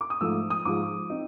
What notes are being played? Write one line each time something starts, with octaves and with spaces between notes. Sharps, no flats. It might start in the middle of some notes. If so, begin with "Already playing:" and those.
D6
D#6
G#2 F3 A3 E6
D#6
G#2 F3 G#3 D6
C4 D#4